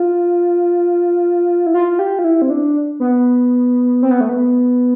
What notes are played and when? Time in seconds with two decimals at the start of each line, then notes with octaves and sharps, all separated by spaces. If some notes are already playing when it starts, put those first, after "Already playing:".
Already playing: F4
1.67 E4
1.74 F4
1.99 G4
2.19 F4
2.24 E4
2.42 C4
2.50 D4
3.00 B3
4.03 C4
4.11 B3
4.21 A3
4.29 B3